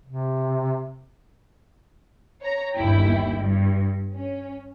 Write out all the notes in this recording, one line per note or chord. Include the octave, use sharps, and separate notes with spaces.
C3
C#5 A#5
G1 D#2 E4 G5
G2
C#4